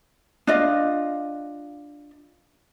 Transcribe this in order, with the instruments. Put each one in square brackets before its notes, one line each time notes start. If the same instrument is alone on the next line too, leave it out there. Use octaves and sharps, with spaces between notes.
[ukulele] D4 F4 D#5